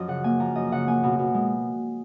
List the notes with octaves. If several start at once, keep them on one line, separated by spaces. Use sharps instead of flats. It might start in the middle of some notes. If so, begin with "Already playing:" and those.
Already playing: F#2 F3 D#5
C#3 F#5
A#3 G#5
F3 A#5
F#2 D#5
C#3 F#5
A#3 G#5
B2
B2
G#3